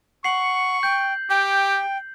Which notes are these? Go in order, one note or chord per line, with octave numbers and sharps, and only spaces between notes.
F#5 C#6 C7 F#7
G5 G6
G4 G5